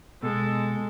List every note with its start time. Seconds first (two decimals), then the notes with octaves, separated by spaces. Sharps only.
0.23 B2 G#3 A4